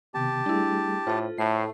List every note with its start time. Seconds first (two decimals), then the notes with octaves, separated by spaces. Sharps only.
0.14 C3 D#3 B3 G4 A5
0.46 G3 A3 D4 E4 G#4
1.07 A2 F4 A4 C5
1.38 A2 A3 C7